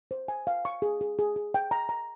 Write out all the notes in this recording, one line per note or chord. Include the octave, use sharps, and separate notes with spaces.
C5
G#5
F5
C#6
G#4
G#4
G#4
G#4
G5
A#5
A#5